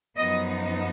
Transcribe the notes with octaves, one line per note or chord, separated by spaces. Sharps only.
F#2 F3 B3 D#4 D#5